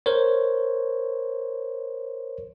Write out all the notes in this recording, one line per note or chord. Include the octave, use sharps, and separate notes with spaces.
A#4 C5 C#5